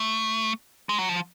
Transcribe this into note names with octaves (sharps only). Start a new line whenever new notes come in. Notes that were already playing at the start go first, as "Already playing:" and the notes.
Already playing: A3
G#3
F#3
F3